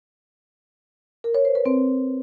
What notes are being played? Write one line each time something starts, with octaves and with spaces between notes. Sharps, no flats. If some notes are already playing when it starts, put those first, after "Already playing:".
A#4
C#5
C5
B4
C4